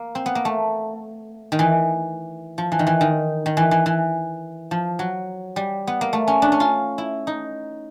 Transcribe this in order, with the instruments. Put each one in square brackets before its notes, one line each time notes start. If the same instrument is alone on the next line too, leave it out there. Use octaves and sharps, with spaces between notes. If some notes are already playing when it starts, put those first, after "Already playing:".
Already playing: [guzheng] A#3
C4
B3
A#3
A3
D#3
E3
F3
E3
D#3
E3
D#3
D#3
E3
E3
E3
F3
F#3
G3
B3
A#3
A3
C#4
D4
C#4
F4
E4
D#4